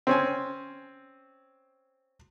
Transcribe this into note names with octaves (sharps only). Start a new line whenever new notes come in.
C4 C#4 G#5